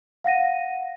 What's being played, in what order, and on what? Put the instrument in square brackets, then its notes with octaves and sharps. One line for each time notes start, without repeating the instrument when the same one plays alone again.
[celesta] F5 F#5 A#6 D#7